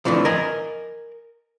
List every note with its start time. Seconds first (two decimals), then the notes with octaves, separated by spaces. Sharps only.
0.05 F2 A2 D3 E3 F3
0.25 A#4 D#5 G#5